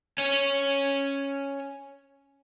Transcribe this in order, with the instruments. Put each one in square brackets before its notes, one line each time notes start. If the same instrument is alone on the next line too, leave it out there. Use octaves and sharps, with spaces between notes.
[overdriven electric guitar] C#4 C#5